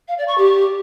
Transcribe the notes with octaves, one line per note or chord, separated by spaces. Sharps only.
F5
D5
C#6
G4